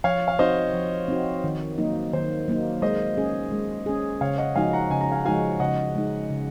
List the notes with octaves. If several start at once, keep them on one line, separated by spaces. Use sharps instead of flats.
F3 C#5 F5
F5
C4 D#4 F#4 C5 D#5
F3
C4 D#4 F#4
D#3
F#3 A#3 D#4
D#3 C5
F#3 A#3 D#4
G#3 C5 D#5
C#4 G#4
G#3
C#4 G#4
C#3 C#5 F5
D#5 F#5
F3 G#3 D#4 F#4 F5 G#5
F#5 A#5
C#3 G#5
A#5
F5 G#5
F3 G#3 D#4 F#4 F5 G#5
C#3 D#5 F#5
G#3 D#4
C#3